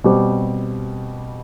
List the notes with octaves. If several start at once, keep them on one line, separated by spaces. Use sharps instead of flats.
B2 G3 C4 G4